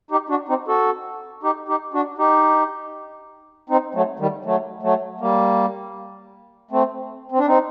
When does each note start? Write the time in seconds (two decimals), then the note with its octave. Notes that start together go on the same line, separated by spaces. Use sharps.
0.11 D#4 G4
0.29 D4 F#4
0.48 C4 D#4
0.68 F#4 A4
1.43 D#4 G4
1.68 D#4 G4
1.94 D4 F#4
2.18 D#4 G4
3.69 C4 D#4
3.94 F#3 A3
4.19 D#3 G3
4.45 F#3 A3
4.82 F#3 A3
5.20 G3 A#3
6.71 A3 C4
7.32 C4
7.39 D4
7.47 C4 D#4